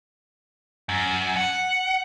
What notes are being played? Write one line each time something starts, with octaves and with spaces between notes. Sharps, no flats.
F#2
F#5